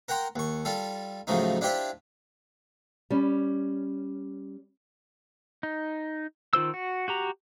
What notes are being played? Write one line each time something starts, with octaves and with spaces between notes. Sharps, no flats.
A#4 F#5 G5 A#5 C6
D#2 C#6
G3 F4 A4
F#2 A2 C#3 F3 A3 D#4
D4 E4 F4 G4 C5 E5
G3 C#4
D#4
D#3 F4 C5 E6
F#4
F#4 G4 A#5